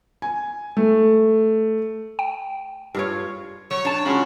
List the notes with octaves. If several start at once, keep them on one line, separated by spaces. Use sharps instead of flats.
G#5
A3
G5
G2 F4 C#5
F#3 C#5
D4 A5
C#3 G#3 C#4 F4 F#4